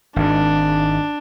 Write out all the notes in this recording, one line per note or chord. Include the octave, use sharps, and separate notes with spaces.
G#1 G#2 D4